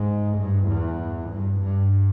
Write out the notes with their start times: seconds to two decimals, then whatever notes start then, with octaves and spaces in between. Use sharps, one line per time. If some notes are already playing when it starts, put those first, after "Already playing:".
Already playing: G#2
0.38 G2
0.68 E2
1.31 G2
1.61 G2